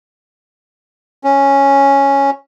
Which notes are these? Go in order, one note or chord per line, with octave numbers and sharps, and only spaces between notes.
C#4